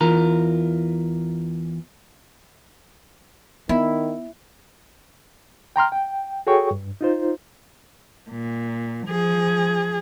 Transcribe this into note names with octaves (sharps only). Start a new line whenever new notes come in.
E2 E3 F4 A#4 A#5
D#3 B3 E4
G5 A#5 C6 F6
G5
F#4 G#4 A4 C#5 G5 C#6
G2
D#4 F4 C5
A#2
F3 G#4